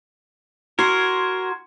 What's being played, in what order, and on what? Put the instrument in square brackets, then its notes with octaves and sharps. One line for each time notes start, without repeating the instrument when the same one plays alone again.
[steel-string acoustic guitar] F#4 [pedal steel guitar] A#4 [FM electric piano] C6 G#6